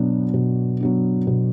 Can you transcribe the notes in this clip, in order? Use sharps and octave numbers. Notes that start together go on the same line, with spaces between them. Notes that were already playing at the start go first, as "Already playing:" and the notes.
Already playing: B2 F#3 B3 D4
B2
F#3 B3 D4
B2